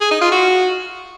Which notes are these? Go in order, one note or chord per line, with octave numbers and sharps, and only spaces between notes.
G#4
D#4
F4
F#4